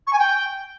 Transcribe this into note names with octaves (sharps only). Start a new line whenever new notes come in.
C#6
G#5
G5